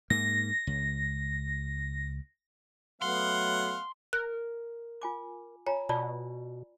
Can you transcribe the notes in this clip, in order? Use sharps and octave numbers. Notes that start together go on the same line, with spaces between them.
G#2 A#3 A#6
C#2
F#3 A3 B3 F5 F#5 C6
A#4 F#6
F4 G#5 D6
F4 C#5 G#5 A#5
B2 F4 D5 A5 E6